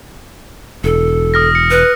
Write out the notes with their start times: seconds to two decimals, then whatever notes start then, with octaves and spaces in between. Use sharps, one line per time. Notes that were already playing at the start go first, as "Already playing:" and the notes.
0.84 E1 A4
1.34 D#6 F6 A#6
1.55 C#7
1.70 B4